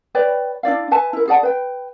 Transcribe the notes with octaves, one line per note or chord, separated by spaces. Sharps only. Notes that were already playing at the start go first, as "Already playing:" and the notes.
B4 C#5 D5 G5
D4 E4 D5 F5
B4 E5 G#5 A5
E4 A#4
G#4 D5 F#5 A5
B4 G5